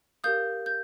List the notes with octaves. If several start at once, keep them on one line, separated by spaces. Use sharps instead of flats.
G4 A#4 F5 D#6 G6
G6